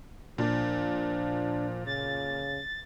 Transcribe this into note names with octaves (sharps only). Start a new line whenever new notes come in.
A#2 F3 D4
C#3 A6